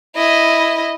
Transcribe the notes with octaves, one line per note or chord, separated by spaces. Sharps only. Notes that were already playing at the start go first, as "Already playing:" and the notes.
E4 D#5